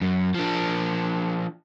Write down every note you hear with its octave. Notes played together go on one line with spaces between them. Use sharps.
F#2
F3 D4